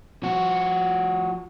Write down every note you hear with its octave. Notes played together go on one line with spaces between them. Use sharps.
F3 F#4